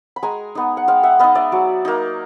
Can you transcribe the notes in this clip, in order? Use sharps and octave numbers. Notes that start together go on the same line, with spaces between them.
B5
G#3 G#5 A#5
B3 D#4
F#5
G#3 F5 G5
E5 F#5
B3 D#4 D#5 F5
D5 E5
F#3
A#3 D#4